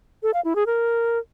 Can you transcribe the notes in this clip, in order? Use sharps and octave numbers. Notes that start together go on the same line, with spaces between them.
A4
F5
E4
G#4
A#4